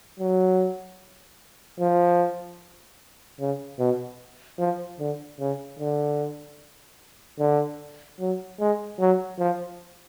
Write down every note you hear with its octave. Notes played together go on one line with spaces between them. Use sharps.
F#3
F3
C#3
B2
F3
D3
C#3
D3
D3
F#3
G#3
F#3
F3